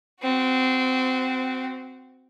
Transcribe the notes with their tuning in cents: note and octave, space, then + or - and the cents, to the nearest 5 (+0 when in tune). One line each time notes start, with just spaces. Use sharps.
C4 -20 F#4 +0